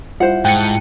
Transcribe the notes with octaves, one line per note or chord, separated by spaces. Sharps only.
G3 E4 F4 C5 F#5
G#2 G5 A5 F#6 C#7 D#7